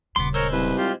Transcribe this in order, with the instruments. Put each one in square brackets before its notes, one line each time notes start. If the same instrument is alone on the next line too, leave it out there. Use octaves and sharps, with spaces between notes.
[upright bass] D#1 C#3 [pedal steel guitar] B3 C6 [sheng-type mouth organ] D6
[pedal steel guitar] G#3 C5 E6 [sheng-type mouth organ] A#4 C#5
[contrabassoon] C2 [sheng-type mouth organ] B4
[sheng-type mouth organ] F4 G4 C6